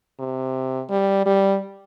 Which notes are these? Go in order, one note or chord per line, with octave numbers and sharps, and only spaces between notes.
C3
G3
G3